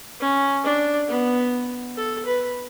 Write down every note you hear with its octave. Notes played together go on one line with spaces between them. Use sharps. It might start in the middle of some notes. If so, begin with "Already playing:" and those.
C#4
D4
B3
A4
B4